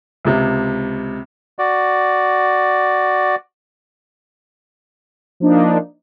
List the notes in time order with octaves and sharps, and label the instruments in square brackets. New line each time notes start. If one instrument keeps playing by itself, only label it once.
[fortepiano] C#2 C3
[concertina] F#4 D5
[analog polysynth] F3 A#3 D4 D#4